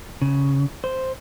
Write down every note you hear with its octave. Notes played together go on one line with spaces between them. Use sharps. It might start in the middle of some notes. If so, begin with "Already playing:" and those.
C#3
C5